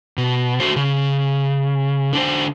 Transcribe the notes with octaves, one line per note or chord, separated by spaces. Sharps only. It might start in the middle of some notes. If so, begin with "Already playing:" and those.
B2
A3 F#4 C5
C#3
D3 D4 C5